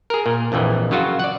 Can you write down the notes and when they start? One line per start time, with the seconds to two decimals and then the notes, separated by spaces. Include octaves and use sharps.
0.10 G#4 A#4
0.26 A#2
0.52 A#1 F2 A#2 E3
0.91 C#3 F#3 F4 F#4
1.19 D5 F#5